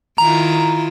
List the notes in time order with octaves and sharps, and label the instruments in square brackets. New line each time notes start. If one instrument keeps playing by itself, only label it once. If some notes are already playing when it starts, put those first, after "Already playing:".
[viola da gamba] D#3 E4 F4 [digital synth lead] A#5